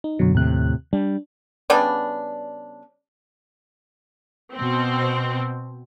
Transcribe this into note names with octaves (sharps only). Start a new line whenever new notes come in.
D#4
F#2 B2 D3 F#3
D#2 A2 C3 F#6
G3 D4
C#3 G3 B3 D4
B2 C4